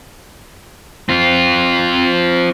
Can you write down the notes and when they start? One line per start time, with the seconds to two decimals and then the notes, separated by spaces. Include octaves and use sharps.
1.09 C4 F4